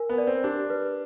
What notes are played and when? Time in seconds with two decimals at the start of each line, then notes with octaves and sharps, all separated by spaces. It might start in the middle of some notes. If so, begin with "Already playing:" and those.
Already playing: A#4 G#5
0.10 B3
0.18 D5
0.27 C4
0.44 D4 G4
0.70 B4